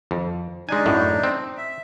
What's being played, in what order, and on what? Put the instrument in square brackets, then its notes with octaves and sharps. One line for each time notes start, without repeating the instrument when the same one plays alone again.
[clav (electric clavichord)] F2
[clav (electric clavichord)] G#3 G#5 [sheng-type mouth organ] D4 D#4
[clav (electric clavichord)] F#2 A2
C4
[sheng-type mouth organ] E5